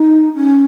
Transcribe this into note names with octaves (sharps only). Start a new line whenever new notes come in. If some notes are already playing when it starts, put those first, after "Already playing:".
Already playing: D#4
C#4